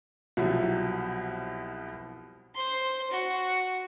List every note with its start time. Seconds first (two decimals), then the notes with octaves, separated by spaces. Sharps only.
0.37 C2 B2 F3 F#3 E5
2.55 C5 C6
3.10 F#4